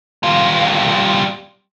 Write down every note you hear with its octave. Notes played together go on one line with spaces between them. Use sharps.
G3 F4